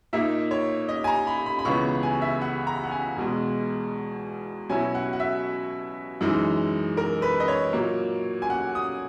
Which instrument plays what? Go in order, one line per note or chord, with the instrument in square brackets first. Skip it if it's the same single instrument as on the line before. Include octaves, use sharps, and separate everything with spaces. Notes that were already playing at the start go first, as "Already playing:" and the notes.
[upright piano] A#2 A#3 D#4 E5
C#5
D#5
G#5
A#5
B5
B5
B5
C#2 C#3 E3 B3 C#6
G#5
E5
F#5
A#5
F#5
G#5
E2 B2 G#3
B2 F#3 C#4 E4 G#5
F#5
F#5
E5
F#2 E3 G#3 D#4
A#4
B4
D#5
C#5
A#2 F#3 A#3
G#5
F#5
D#6